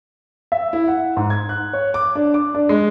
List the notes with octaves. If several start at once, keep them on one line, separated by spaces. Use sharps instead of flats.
E5
E4
F#5
G#2
G#6
F#6
C#5
D6
D4
D6
D4
G#3